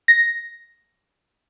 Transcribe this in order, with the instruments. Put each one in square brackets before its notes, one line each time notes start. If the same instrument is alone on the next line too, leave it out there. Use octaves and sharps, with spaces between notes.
[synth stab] A#6